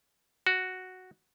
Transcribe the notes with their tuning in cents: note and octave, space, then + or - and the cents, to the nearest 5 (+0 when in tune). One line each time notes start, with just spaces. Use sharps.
F#4 +0